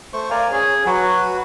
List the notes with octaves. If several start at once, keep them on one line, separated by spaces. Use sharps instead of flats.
A3 C5 C#6
A#4 D5 F5 G#5
C#4 G#4
F#3 F#4 B4